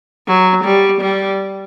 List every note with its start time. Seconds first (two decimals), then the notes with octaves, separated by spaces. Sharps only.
0.28 F#3
0.64 G3
1.01 G3